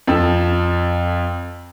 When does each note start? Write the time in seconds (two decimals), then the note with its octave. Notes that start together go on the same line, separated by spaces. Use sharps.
0.07 F2 A4 E6